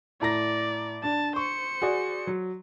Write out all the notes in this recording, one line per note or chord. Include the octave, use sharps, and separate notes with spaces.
A2 D5 A#5 A#6
D4 A5
C5 C#6 C#7
F#4 G#4 D5
F#3